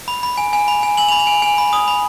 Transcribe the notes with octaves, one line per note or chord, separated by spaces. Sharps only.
B5
B5
G#5
G#5
B5
G#5
G#5 F#7
F7
B5
F7
G#5
G#5
B5
D#6
B5